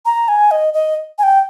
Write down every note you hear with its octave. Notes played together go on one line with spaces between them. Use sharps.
A#5
G#5
D#5
D#5
G#5
G5